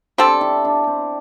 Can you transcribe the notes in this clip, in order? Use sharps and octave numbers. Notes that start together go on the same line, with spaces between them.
G3 C4 D4 A4
E4
D4
C4